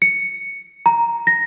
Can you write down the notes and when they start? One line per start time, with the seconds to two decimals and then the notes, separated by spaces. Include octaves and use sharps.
0.02 C#7
0.86 A#5
1.27 A#6